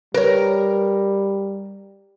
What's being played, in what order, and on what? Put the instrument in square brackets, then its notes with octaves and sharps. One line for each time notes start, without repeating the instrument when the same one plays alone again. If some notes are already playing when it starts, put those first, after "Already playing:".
[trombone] G3 [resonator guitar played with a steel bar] A#4 [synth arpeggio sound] B4 C#5